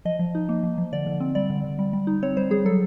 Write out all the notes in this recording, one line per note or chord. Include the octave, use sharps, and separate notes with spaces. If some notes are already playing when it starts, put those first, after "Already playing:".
F3 D#5
F3
D#4
A#3
F3
F3
D3 D5
D3
C4
G3 D5
D3
D3
G3
G3
D#4
C4 C#5
G3 C5
G3 G#4
F#3 A4